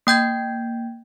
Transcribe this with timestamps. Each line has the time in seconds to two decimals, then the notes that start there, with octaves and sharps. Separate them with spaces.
0.07 A#3 G5 G6 G#6